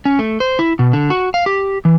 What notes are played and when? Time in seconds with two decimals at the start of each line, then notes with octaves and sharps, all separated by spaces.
0.05 C#4
0.19 A3
0.40 C5
0.59 E4
0.79 B2
0.93 D3
1.10 F#4
1.34 F5
1.46 G4
1.85 E3